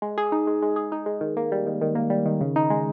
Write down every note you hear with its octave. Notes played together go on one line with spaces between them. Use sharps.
G#3
G#4
D#4
G#3
G#3
G#4
D#4
G#3
D#3
A#3
G3
D#3
D#3
A#3
G3
D#3
C#3
D#4
G#3